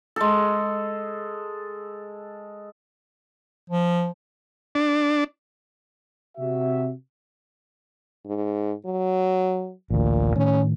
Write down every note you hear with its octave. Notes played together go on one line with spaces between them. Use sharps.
G#3 A4
F3
D4
C3 F#4 E5
G#2
F#3
A1 D2 A#2
A2 D#3 C#4